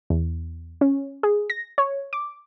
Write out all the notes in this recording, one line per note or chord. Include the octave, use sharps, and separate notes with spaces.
E2
C#4
G#4
A#6
C#5
D6